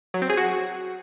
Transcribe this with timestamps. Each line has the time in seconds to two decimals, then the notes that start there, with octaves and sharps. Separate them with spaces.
0.14 F#3
0.22 C4
0.30 G#4
0.37 F#4